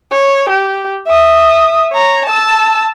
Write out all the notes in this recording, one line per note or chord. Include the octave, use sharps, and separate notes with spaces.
C#5
G4
E5 D#6
C#5 A#5
A5 E6